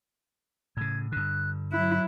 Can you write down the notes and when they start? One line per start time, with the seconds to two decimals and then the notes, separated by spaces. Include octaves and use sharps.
0.77 A2 C#3 G#6
1.12 G2 D3 F#6
1.72 F#3 E4 F#6